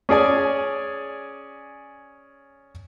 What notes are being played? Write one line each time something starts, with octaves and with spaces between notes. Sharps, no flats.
C#4 G#4 D5 G#5